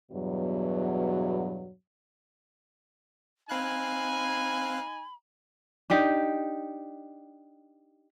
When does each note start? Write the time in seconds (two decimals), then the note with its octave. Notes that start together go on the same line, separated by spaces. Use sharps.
0.12 E2 G2 B2 F#3
3.50 C4 D#4 F5 G#5 B5 F#6
5.90 D4 D#4 G4 D#5